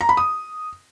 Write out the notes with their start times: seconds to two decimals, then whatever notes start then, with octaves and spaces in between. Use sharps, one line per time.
0.01 A#5
0.09 B5
0.17 D#6